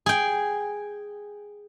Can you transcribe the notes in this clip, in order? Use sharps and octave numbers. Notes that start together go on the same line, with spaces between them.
G#4 G5